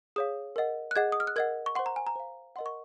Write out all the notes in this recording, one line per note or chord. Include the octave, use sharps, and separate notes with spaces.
G#4 C#5 F5 D#6
A#4 D#5 F#5
F#6
G#4 D#5 F#5 G#6
D#6
F6
F#6
A#4 D#5 F#5 G#6
C#6
C5 F#5 C6
A#5
G#5
A#5
C5 F5
A#4 D#5 F#5 C6
C#6